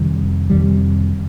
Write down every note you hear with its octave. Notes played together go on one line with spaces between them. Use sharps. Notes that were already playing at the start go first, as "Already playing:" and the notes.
Already playing: F2 C3 D#3 G3
F2 C3 D#3 G3